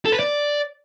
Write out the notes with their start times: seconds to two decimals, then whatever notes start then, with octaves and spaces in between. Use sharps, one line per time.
0.05 A4
0.12 B4
0.20 D5